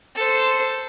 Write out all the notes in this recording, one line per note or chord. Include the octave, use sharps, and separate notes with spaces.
A4 C5